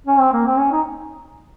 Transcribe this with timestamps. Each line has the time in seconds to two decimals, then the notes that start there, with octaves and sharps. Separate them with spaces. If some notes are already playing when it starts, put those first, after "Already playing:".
0.07 C#4
0.20 C4
0.33 A#3
0.46 C4
0.58 C#4
0.72 D#4